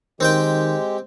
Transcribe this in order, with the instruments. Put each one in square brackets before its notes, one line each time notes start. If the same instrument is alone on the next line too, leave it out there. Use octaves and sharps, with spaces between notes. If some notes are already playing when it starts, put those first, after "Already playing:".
[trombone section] D#3 [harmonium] G#3 G4 [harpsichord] C4 C5 G5